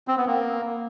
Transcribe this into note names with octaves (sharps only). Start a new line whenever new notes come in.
C4
B3
A#3